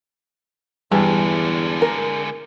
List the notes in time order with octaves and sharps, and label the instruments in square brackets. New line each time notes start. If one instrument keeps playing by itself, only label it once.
[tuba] E2 [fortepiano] G2 [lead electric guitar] D3 G#3 [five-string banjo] E3
[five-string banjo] A#4